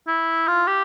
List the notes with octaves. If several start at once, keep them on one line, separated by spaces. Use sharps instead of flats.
E4
F4
G4